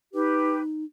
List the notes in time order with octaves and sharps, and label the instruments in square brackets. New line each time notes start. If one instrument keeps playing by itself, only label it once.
[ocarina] D#4 [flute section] G4 B4